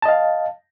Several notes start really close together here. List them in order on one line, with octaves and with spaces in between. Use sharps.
A5 D#5 F5